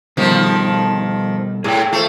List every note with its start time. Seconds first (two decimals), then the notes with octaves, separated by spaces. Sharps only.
0.17 B2 D#3 F3 G3 A3
1.64 A2 G#4 A4 G5
1.92 A3 F4 C5